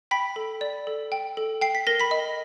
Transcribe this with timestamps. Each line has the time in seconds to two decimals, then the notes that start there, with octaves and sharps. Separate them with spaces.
0.11 G5 B5 B6
0.36 A4
0.61 D5
0.87 A4
1.12 G5
1.37 A4
1.61 G5 C7
1.75 B6
1.87 A#4 A#6
2.00 B5 B6
2.11 D#5